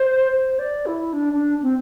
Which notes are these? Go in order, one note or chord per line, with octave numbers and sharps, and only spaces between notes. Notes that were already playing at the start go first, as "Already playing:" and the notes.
Already playing: C5
C5
D5
E4
D4
D4
C4